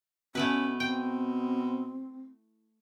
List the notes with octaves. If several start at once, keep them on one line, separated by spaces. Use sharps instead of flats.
B2 A3 C#4 E4 B4
C4 G5